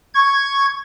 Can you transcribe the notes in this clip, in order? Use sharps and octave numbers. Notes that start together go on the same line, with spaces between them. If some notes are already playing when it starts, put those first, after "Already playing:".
C#6 G#6